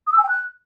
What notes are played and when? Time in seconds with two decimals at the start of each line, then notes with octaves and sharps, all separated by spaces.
0.07 D#6
0.12 E6
0.18 G#5
0.23 G5
0.29 F#6